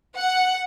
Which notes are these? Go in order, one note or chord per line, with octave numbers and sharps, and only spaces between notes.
F#5